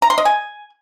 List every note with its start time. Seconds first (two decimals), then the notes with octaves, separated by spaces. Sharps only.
0.02 A#5
0.10 C6
0.18 D#5
0.25 G#5